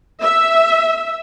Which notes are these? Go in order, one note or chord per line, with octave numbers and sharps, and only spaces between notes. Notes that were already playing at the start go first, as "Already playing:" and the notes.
E5